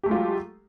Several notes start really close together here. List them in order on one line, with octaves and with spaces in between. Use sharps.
G4 A3 G#3 F4 F#3